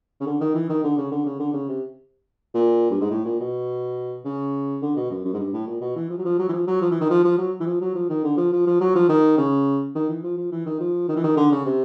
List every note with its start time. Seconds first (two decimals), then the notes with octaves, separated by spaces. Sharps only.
0.20 C#3
0.26 D3
0.41 D#3
0.55 E3
0.69 D#3
0.84 D3
0.98 C#3
1.12 D3
1.26 C#3
1.39 D3
1.53 C#3
1.69 C3
2.54 A#2
2.91 G2
3.01 G#2
3.11 A2
3.25 A#2
3.40 B2
4.25 C#3
4.82 D3
4.96 B2
5.10 F#2
5.25 F#2
5.34 G#2
5.39 G2
5.53 A2
5.67 A#2
5.81 B2
5.96 E3
6.10 F3
6.18 F#3
6.25 F3
6.39 F#3
6.49 E3
6.53 F3
6.67 F#3
6.81 F3
6.91 E3
7.01 D#3
7.10 F3
7.24 F3
7.38 F#3
7.60 E3
7.66 F3
7.81 F#3
7.95 F3
8.10 D#3
8.24 D3
8.37 F3
8.52 F3
8.66 F3
8.81 F#3
8.95 F3
9.09 D#3
9.38 C#3
9.95 D#3
10.09 E3
10.23 F3
10.37 F3
10.52 E3
10.66 D#3
10.80 F3
11.08 D#3
11.16 E3
11.23 D#3
11.37 D3
11.52 C#3
11.66 C3